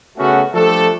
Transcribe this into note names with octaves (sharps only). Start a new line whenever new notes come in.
C#3 A3 B3 C#4 F#4
F3 G3 A3 D4 A4